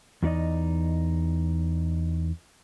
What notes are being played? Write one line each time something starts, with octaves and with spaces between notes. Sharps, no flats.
E2 F#3 D#4 D5 D#5